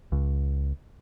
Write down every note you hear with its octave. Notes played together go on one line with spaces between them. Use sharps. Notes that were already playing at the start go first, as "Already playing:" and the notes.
C#2